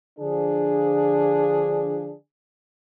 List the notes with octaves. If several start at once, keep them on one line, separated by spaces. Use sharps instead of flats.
D3 F3 D4 G#4